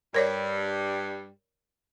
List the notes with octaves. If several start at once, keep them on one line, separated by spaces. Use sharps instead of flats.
G2 G3 A#4 C#5 D5